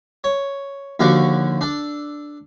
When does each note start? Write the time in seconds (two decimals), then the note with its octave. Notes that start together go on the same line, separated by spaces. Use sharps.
0.24 C#5
1.00 D#2 D3 F3 F#4 C#6 D6
1.61 D4 A4